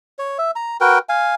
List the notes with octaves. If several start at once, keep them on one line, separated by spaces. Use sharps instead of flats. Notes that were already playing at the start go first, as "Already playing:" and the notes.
C#5
E5
A#5
F#4 A#4 B4 G5
F5 G#5